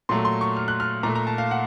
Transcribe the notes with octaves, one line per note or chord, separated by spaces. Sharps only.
A#2 F#3 A3 C6
C6
C#6
F6
F#6
F6
A#2 A3 A#5
A#5
A5
F5
F#5